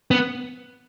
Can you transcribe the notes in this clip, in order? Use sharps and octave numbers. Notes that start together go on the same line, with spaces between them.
B3